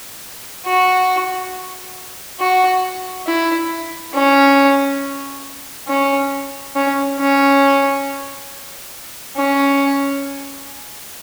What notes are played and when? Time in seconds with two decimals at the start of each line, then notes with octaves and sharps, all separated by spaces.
0.66 F#4
2.39 F#4
3.27 E4
4.14 C#4
5.88 C#4
6.75 C#4
7.19 C#4
9.36 C#4